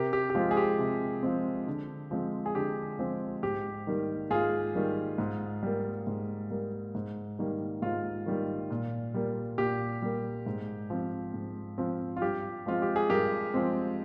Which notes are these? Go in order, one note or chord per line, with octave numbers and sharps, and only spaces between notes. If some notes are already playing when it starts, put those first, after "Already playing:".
Already playing: C3 G4 A#4
G4
G4
F3 G#3 C4 F4
G#4
G4
C3
F3 G#3 C4
D3
F3 G#3 C4
G#4
D3 G4
F3 G#3 C4
G#2 G4
D#3 G3 A#3
G#2 F4 G#4
D#3 G3 A#3
G#2
G3 A#3
G#2
G3 A#3
G#2
D#3 G3 A#3
G#2 F4
D#3 G3 A#3
A#2
G3 A#3
A#2 G4
G3 A#3
G#2
F3 C4
G#2
F3 C4
F4
G2 G4
F3 G#3 C4 F4
G4
G#4
G2 G4 A#4
F3 G#3 C4